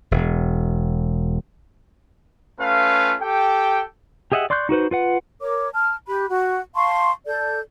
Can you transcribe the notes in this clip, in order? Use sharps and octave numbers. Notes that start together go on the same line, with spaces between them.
E1
A3 C#4 F4 B4 F5
G4 A4 G5
G4 G#4 D#5 E5 F#5
D5 C6 C#6 F#6 G6
D#4 F#4 B4 C5
F4 B4 F#5
A#4 C#5 D6
A5 F6
G4 B5 F#6
F#4
F5 A5 C6 C#6
A4 D5 G6